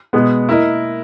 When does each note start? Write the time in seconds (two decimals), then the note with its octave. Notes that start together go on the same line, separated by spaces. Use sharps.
0.13 B2 G#3 B3
0.48 A#3 E4 A#4 D#5